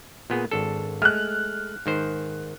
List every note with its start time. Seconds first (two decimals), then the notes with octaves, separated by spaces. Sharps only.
0.30 A#2 B3 G#4
0.51 G#1 D4 A4
1.02 G#3 A3 F6 F#6
1.86 G#2 D#3 C5